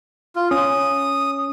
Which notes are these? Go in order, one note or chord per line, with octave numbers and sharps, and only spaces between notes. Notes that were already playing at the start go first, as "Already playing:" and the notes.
F4
C#4 D#6